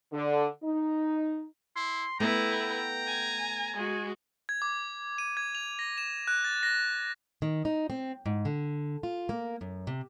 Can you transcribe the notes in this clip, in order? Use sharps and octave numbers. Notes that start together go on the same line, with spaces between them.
D3
D#4
E4 C6
A3 B3 E4 B4 G5 A#5
G#5
G#3 F#4 G#5
G#6
D6
D#7
G#6
F7
A#6
E7
F#6
A6
A#6
D#3
D#4
C4
G#2
D3
F4
A#3
F#2
C3